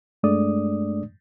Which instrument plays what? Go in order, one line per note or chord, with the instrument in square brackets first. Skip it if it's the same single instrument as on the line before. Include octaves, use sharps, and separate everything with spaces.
[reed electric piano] G2 G#3 A3 D4 D5 D#6